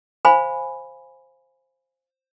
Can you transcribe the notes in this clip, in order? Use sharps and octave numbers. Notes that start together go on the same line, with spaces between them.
C5 F5 G#5 B5